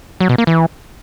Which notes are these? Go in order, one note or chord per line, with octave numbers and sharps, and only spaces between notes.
F#3
B2
A#3
E3